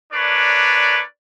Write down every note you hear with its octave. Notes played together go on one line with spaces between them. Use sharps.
D4 A#4 B4 C#5 D5